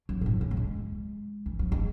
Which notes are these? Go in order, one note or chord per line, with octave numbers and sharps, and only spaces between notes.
F#3
G#2
A2
C#3
A3
G#3
E3
F#3
G#3